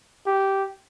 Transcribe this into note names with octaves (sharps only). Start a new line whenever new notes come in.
G4